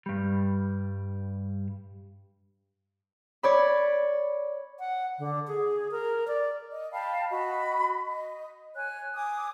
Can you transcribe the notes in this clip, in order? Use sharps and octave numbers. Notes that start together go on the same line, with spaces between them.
G2 G3
C#5 D5 B5
F#5
D3
G#4
A#4
D5
D#5
F5 G5 A5 B5
F#4 D#5 B5
D#5
C#5 G#5 F#6
G#5 D6 D#6